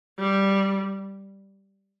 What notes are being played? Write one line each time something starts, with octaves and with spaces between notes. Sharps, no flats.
G3